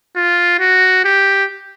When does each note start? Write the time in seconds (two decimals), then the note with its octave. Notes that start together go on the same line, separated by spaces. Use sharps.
0.16 F4
0.60 F#4
1.04 G4